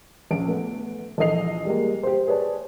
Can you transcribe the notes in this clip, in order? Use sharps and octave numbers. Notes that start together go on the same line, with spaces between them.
A#1 C#4 D7
A3 B3
A#1 E3 A4 D#5 C7 F7
G3 G#3 A#3
G4 C5
G#4 B4 C#5 D5 A5